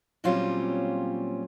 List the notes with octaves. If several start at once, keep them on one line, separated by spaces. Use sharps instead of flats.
A#2 F#3 G3 C4 C#4 F4